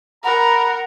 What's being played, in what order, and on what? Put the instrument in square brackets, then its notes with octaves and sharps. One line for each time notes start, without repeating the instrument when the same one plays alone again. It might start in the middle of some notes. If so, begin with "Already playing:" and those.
[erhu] A#4 [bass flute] F#5 [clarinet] A#5 [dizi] B5